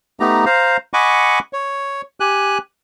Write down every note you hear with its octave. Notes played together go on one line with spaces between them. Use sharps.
A3 B3 D#4 G4 A#5
C5 F5 A#5
D#5 F#5 G#5 B5 C#6 D6
C#5
G4 G#5 F#6